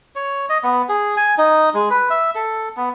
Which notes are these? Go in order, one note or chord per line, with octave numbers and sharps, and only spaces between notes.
C#5
D#5
B3
G#4
G#5
D#4
G#3
B4
E5
A4
B3